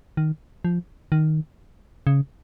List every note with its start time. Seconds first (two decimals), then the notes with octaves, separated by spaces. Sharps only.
0.17 D#3
0.65 F3
1.12 D#3
2.07 C#3